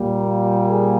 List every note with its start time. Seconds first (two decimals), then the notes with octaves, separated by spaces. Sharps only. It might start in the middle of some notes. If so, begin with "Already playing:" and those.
Already playing: A#2 G3 A#3
0.67 G#4